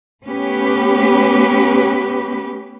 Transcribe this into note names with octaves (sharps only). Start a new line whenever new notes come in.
A3 B3 C#4 G4 B4